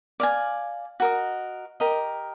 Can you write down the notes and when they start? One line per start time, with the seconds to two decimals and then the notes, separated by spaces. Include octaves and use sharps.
0.20 D5 F5 G#5
1.00 F#4 A#4 D#5
1.80 G4 A#4 D#5